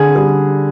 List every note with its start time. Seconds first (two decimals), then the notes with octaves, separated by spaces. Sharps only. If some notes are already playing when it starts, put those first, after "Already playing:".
Already playing: D3 G#4
0.15 G3 G#4